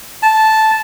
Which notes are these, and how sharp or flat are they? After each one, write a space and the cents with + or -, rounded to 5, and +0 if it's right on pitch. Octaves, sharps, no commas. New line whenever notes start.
A5 -10